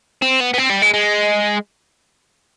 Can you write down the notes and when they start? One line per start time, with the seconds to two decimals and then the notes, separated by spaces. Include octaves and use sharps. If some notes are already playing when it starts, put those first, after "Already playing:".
0.22 C4
0.40 B3
0.54 B3
0.58 C4
0.70 G3
0.82 G#3
0.94 G#3